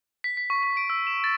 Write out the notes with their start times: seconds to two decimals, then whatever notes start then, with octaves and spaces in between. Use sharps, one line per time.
0.24 B6
0.37 B6
0.50 C#6
0.63 C#6
0.77 D7
0.90 E6
1.07 E7
1.24 A6